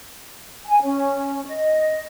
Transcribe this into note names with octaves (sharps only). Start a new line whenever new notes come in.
G#5
C#4
D#5